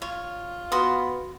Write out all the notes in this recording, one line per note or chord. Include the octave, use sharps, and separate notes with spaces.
F4 C#5
B3 F#4 C6 D#6